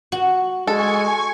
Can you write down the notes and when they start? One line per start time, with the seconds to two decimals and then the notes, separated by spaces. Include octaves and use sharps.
0.12 F#4
0.67 G#3 A4 G#5 C#6